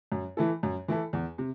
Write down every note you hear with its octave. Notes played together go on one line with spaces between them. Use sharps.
F#2
E3 A3 E4 A4
F#2
E3 A3 E4 A4
E2
C3